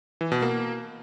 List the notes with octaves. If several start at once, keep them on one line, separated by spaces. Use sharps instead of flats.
E3
B2
A#3